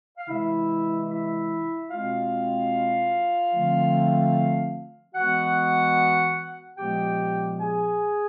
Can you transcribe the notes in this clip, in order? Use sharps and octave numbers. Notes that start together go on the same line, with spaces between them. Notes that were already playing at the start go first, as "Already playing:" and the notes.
F5
C3 E3 G#3 E4 E5
E4 E5
B2 G#3 C4 F4 F5
D3 F3 A3 C4
E3 G#3 B3 F#4 F#5
A#2 F3 G#3 B3 G4 G5
G#4 G#5